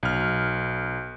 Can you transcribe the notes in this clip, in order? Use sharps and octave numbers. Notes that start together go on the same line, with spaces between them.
B1 F6